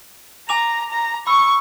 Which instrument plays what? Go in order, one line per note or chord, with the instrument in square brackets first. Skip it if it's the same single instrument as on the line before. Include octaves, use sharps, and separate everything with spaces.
[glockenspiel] G#5 D6 F7 [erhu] A#5
[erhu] A#5
[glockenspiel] B5 E6 [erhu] C#6